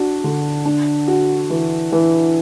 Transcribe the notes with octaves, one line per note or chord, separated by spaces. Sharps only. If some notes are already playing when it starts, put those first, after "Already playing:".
Already playing: D4 F#4
D3
D4
F#4
E3
E3